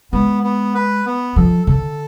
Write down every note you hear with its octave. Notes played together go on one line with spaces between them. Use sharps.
G#3 B3
B3
B4
B3
F3 A4
D3 A4